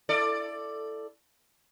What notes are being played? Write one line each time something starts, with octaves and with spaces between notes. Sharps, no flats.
E4 A4 D5